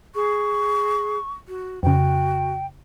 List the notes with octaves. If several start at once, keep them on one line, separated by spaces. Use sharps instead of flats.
G#4 C#6
F#4
F2 C#3 F#4 G5